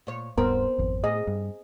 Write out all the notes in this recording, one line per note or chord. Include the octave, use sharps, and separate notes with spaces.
A#2 C#5
D1 G2 B3 C4 A#4
G#1 F2
A2 G#4 D#5
G2